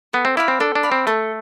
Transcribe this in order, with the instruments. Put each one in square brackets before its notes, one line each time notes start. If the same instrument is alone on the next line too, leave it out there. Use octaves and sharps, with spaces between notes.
[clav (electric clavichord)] B3 [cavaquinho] A4
[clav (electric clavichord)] C4
[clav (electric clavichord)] E4 [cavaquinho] D5 F5 B5
[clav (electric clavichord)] C4
[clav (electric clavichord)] D4 [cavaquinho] A4
[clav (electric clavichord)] D4
[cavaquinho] D5 F5 B5
[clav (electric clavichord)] C4
[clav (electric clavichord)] A3 [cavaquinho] A4